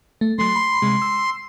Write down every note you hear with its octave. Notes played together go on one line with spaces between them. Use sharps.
A3
F#3 A3 C6
B5
C3 G#3
E6